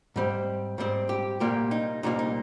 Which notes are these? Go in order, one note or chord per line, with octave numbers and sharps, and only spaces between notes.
G#2 G3 C4
G#2 G3 C4
G4
C2 A#2 G3 A#3 G4
D#4
C2 A#2 G3 A#3 D#4
D#4